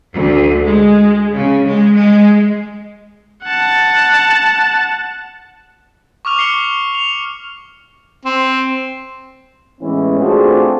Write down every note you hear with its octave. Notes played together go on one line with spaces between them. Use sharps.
D2
G#3
C#3
G#3
G#3
F#5 A5
C#6 D6 F6 F7
C7 C#7 G7
F7
C4
A2 E3 G#3 B3 C#4
A3 C4 D4 F4 F#4 G#4